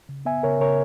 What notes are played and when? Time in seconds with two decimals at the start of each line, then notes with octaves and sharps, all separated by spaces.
0.09 C#3
0.25 B3 E5 G#5
0.43 C#3 A#4 C#5
0.60 C#3 A#4 C#5